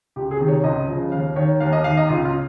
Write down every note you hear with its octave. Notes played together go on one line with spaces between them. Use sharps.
C#2 G4
G#4
C3 D#3
C#5
C#2 D#5
C#3 F3
D#2 F5
D#3 C#5
D#2 F5
D#5
D#3 F5
D#5
C#2 F4
F4